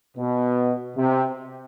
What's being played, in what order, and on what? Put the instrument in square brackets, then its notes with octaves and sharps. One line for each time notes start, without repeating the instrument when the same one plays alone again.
[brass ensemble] B2
C3